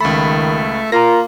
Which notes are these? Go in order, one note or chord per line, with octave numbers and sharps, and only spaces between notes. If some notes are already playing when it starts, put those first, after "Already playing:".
C#2 D#3 A3 B5
A#3 F4 A#4 A#5 A#6